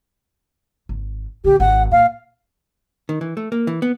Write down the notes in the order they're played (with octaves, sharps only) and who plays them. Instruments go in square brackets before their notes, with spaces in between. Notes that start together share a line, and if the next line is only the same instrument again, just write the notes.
[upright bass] G#1
[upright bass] A#1 D3 [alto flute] G4
[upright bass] G#1 [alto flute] F#5
[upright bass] A#2 A#3 [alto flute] F5
[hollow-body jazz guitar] D#3
E3
A3
A#3
E3
B3